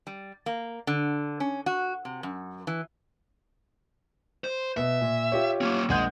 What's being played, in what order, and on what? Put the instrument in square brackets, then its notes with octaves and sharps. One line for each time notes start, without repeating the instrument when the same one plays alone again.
[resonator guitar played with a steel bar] G3
A#3
D3
C#4
F#4
C3
F#2
E3
[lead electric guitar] C5
[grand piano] B2 [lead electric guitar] E5
[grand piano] A#2
F4 G4 C#5
[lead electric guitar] A#3 C#4
[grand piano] A#1 F#5 G6 [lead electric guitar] G#3